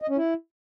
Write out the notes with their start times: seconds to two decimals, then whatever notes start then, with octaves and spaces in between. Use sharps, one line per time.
0.02 D#5
0.09 C#4
0.17 E4